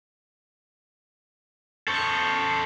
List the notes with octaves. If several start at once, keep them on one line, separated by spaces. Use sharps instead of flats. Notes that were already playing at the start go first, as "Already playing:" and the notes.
A4 C5 C#6